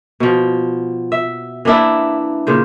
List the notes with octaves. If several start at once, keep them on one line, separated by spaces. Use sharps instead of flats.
B2 F3
E5
E3 A#3 D4 E4
A#2 C#3 C5